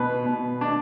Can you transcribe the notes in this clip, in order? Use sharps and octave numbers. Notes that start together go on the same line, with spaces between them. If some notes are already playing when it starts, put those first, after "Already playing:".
Already playing: B2 B4
B2
D4